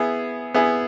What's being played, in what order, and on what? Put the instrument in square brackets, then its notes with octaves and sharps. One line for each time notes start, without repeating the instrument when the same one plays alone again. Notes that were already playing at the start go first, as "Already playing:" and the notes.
Already playing: [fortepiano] B3 E4 G#4
B3 E4 G#4